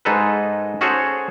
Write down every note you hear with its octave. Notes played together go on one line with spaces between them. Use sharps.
G#2 G#3 D#4 A4 B4
C#4 F#4 G#4 A4 C5 C#5